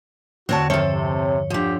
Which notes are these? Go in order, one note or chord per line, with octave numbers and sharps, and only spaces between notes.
E2 D3 C4 F#4 C#5 A5
G2 D#3 F3 C4 A4 C#5 E5
C3
D3 F3 G4